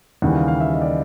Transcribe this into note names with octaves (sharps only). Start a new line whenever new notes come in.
D#2 C#3 E3 G3 F#5
F5
F5
E5
D#5
D5
D#5